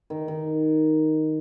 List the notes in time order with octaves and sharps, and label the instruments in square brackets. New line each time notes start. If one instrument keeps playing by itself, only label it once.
[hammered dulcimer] D#3
D#3